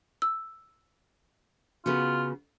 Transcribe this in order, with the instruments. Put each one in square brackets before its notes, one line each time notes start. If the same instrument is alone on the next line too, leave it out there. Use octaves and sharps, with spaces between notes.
[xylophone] E6
[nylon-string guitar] C#3 B3 F#4 [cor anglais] F4